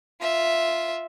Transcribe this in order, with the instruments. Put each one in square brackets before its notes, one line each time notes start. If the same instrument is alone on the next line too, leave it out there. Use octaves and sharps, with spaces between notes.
[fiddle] F4 E5